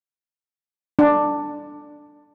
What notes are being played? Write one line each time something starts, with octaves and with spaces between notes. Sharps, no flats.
D4